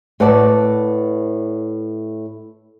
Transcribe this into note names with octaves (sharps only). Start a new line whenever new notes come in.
A2 B4 D5 F#5 A5